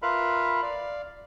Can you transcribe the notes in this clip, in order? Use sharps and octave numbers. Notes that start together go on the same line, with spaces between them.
F4 A#4 B4 E5 F5 B5
D5 F5